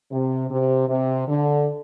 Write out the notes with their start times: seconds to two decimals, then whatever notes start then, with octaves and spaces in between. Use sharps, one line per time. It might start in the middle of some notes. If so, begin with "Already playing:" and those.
0.12 C3
0.51 C3
0.89 C3
1.28 D3